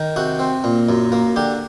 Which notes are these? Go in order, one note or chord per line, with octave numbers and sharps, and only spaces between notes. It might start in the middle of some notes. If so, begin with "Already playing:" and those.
Already playing: D#3
C3 F#4
C4
A#2
F#2
A#3
D3 G4